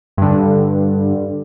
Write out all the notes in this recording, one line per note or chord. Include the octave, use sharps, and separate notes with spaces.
G2 D3